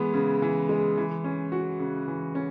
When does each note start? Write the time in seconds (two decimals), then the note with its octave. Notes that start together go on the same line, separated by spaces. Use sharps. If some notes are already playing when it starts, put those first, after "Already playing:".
Already playing: E3 G#3 B3
0.14 C#3
0.42 E3
0.69 G#3
0.97 E3
1.24 C#4
1.52 F#4
1.79 C#3
2.08 E3
2.35 C#4